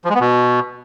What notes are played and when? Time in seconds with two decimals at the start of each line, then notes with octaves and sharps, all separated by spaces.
0.05 F3
0.10 G#3
0.15 B3
0.20 B2